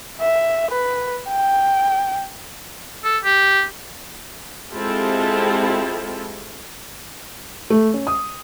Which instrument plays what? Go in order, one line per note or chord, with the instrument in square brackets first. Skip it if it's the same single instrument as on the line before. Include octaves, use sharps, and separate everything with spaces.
[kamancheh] E5
B4
G5
[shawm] A4
G4
[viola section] G#3 C4 E4 F4 G4 A4
[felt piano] A3
C#4
D#6